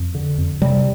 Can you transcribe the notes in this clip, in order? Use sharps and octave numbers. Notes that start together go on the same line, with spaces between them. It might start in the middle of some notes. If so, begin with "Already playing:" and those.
Already playing: F2
D3
F2
C3 G3